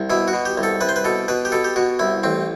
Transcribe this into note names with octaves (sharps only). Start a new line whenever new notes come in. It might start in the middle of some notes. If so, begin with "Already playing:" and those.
Already playing: C2
B2 E4
F#4
B2
G4
C2
A4
C2 B4
C5
B4
B2 A4
B2 B4
G4
B2 A4
G4
B2 F#4
C2 E4
A1 C4